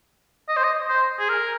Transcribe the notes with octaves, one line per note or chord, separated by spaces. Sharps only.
D#5
C5
D#5
C5
G#4
A#4